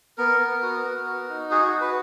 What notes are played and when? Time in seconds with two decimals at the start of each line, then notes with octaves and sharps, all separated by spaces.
0.18 B3 A#4
0.40 B3
0.62 F#4
0.85 B3
1.06 F#4
1.29 D#4
1.51 F#4 G#4
1.72 F#4
1.81 B4